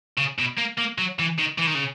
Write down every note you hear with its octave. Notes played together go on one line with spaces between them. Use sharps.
C#3
B2
A#3
A#3
F#3
E3
D#3
E3
D#3
C#3